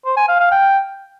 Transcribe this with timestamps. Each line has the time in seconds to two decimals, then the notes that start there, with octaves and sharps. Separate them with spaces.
0.05 C5
0.17 G#5
0.29 F5
0.40 F5
0.52 G5